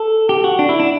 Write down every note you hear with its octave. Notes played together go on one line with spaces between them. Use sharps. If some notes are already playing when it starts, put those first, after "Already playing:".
Already playing: A4
G4
F#4
D4
E4
D4